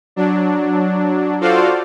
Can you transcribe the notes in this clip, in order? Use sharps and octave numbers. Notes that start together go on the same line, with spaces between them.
F#3 D4
F4 F#4 A4 C5 D5 F5